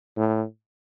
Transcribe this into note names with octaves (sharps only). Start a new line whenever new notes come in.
A2